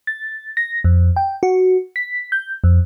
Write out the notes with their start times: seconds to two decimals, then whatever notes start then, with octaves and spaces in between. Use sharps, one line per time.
0.07 A6
0.57 A#6
0.84 F2
1.16 G5
1.43 F#4
1.96 B6
2.32 G6
2.64 F2